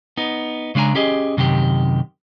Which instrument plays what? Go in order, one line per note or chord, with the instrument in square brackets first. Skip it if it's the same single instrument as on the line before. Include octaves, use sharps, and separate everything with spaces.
[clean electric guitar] B3 D#4
C#3 G#3 D4 G#5 A#5
C#4 G4 G#4 D#5
F#2 C3 D#3 G4